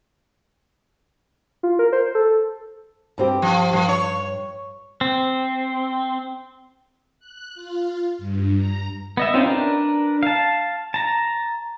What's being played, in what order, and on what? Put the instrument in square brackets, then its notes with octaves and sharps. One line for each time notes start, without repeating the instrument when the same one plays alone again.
[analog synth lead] F4
A#4
C5
A4
[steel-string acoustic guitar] G2 C4 G4
[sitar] F3
[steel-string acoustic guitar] G2 [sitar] F3
[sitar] C#5
[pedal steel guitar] C4
[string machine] F#6
F4
G2
A#5
[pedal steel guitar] B3 D#5 E5
C4 C#4 D#4 F4 G4
D4 A#4 B4
F5 A5
A5 A#5